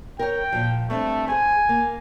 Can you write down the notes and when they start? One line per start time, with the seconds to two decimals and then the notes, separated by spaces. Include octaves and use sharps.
0.19 A#4 C#5 G5
0.52 A#2 F3
0.90 G2 A3 C4
1.28 G#4 C5 G#5
1.69 A#3